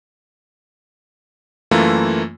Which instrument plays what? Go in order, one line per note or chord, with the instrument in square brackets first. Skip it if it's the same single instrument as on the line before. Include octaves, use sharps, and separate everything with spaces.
[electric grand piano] F#2 E3 A3 A#3 F4